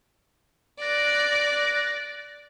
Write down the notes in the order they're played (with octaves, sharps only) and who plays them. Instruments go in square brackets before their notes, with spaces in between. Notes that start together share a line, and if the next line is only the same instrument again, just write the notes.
[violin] D5 [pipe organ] F#6 A6 A#6